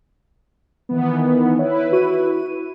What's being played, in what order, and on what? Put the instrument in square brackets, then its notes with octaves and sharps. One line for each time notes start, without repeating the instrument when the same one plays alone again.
[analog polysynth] D#3 E3 B3
[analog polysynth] E4 B4 [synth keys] C#5
[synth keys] F#4 C#6 D#7